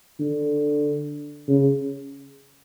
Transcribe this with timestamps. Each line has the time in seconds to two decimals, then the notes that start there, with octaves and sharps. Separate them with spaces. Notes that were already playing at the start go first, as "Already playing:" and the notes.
0.20 D3
1.48 C#3